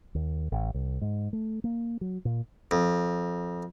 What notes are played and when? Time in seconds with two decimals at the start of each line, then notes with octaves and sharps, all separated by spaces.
0.15 D#2
0.52 A1
0.74 C2
1.02 G#2
1.33 A3
1.64 A#3
2.01 F#3
2.25 A#2
2.71 F2